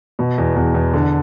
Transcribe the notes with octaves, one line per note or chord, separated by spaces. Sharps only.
B2
E2
E2
E2
D3